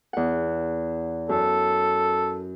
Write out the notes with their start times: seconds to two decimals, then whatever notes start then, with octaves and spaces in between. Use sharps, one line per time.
0.13 E2 F#5
1.29 F#2 A4